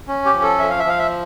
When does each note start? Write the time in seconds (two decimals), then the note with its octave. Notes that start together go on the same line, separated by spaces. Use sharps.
0.08 C#4
0.25 G4
0.34 F3
0.42 A4
0.59 F3 E5
0.70 F5
0.79 E5
0.85 F3 F5
0.99 E5